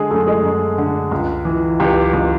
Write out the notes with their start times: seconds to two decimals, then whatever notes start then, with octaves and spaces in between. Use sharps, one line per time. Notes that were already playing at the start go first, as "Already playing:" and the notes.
Already playing: D3 G#3 G#4
0.10 F#2 A3 A4
0.27 G#3 G#4
0.43 F#2
0.78 D3
1.11 C#2
1.45 E3
1.80 C#2 G4
2.13 C#2